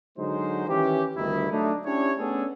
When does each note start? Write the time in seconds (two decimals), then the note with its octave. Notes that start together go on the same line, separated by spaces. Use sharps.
0.18 D3 F#3 G#3 D#4 C5
0.67 D#3 E3 C#4 G4
1.16 G1 D2 G2 D#3 D#4 E4
1.50 F#3 A3 D4 D#4
1.85 C#4 D4 E4 G4 C#5
2.18 A3 B3 C#4 D4 G#4 A4